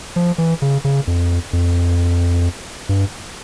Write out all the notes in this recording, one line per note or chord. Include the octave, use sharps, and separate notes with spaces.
F3
E3
C#3
C#3
F2
F2
G2